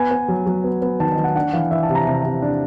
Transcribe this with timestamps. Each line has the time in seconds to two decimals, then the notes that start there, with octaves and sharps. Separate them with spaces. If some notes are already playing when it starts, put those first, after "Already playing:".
Already playing: B3 G#5
0.11 B3
0.28 F#3
0.46 F#3
0.64 B3
0.82 B3
1.00 D#3 A5
1.12 D#5
1.17 D#3
1.24 F#5
1.36 D4 F#5
1.53 E3 F5
1.71 E3 E5
1.83 A5
1.89 C3
1.95 A#5
2.07 C3
2.24 C3
2.42 D4